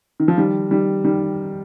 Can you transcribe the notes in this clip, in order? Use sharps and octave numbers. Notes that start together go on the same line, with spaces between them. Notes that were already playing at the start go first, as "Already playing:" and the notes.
D#3
F3
D#3 G3
D#3 G3
D#3 G3